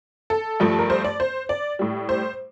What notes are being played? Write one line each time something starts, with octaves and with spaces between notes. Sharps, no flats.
A4
G2 F3 A3
A#4
C5
D5
C5
D5
A2 G3
C5